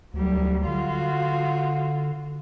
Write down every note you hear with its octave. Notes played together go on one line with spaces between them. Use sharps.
D2 F#3 G3
D3 F4 F#4